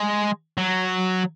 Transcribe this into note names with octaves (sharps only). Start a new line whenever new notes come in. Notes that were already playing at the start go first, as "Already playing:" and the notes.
Already playing: G#3
F#3